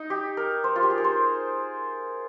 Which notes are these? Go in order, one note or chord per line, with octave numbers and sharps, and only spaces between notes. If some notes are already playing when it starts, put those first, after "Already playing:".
Already playing: D#4
G4
A#4
C5
F4
G4
G#4
A#4
C5